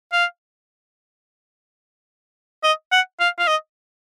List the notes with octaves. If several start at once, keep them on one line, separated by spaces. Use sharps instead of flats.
F5
D#5
F#5
F5
F5
D#5